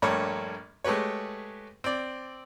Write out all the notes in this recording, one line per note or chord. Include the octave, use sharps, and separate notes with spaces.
A#1 G2 A3 A#3 C#5
G#3 A3 G4 B4 C#5
C4 D5